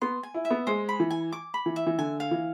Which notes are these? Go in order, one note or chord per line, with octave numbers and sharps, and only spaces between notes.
B3 C6
G#5
E4
E5
B3
G#3 C5
B5
E3
G#5
D6
B5
E3
E5
E3
D3 G#5
F5
E3